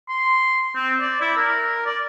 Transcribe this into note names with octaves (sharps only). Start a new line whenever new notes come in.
C6
C4
D5
E4
A#4
D5